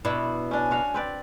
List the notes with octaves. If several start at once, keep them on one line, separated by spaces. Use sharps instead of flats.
B2 D4 E4
C#4 D4 G#5
F#4 F5
C4 B4 D5